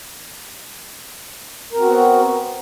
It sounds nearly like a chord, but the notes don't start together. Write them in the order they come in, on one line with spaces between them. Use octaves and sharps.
A#4 C4 F#4 B3